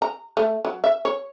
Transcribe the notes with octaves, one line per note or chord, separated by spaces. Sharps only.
A#5
A3
F#3
E5
C#5